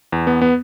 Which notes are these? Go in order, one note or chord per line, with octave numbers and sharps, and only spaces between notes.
E2
B3
B3